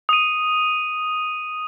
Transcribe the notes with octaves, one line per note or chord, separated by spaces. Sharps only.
D#6 D#7